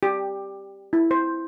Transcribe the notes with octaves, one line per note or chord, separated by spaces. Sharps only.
G4
E4
C5